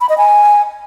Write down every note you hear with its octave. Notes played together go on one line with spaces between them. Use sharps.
B5
D#5
G#5